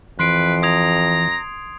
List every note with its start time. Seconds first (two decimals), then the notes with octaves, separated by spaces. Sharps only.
0.19 F2 E3 B4 C6 C7 D7
0.63 A#5 D#6 G#6 F7